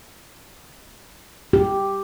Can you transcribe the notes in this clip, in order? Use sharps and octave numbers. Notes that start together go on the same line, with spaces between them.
G4